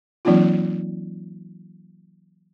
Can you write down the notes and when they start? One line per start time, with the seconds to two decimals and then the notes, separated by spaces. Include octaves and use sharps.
0.25 E3 F#3 A#3 C4 D#4 F4